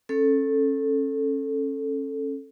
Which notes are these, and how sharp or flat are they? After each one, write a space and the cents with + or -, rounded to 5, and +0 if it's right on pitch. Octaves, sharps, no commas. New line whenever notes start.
C#4 -30 A4 +0